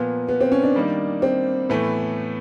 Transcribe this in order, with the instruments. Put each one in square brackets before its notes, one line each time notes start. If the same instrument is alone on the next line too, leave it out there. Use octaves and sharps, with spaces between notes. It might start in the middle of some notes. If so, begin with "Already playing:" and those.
Already playing: [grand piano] A#2 F3 A#3 [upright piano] B3
[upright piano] B3
C4
C#4
D4
[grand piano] D#3 G3 A#3 D#4
[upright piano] C4
[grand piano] A2 E3 A3 [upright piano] B3